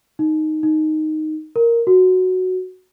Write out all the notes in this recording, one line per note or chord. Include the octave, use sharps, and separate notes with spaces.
D#4
D#4
A#4
F#4